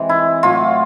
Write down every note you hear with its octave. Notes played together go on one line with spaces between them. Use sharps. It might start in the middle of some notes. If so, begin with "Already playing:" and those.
Already playing: C3 E3 G#3
E4
A2 F#3 F4